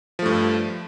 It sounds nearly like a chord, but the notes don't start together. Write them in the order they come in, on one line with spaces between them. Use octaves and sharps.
F3 A3 G2